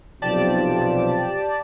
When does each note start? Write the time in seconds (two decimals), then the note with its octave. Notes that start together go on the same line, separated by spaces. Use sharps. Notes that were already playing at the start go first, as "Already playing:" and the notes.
0.22 B1 C3 F3 G4 D5 A5